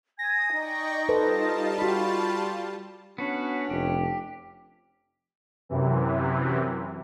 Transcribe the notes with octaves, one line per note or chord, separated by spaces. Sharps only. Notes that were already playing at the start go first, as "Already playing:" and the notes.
G#5 D#6 G#6 A#6
D#4 D5 G5 C#6
G3 F4 A4 B4 C5 A5
F#4 G4 B5
B3 C#4 D4 F#4
F1 G4
F#2 C3 E3